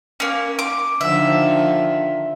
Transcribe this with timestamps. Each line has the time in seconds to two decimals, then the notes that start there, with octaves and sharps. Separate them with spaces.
0.20 A#3 C#4
0.59 D6
1.01 D3 D#3 F3 E5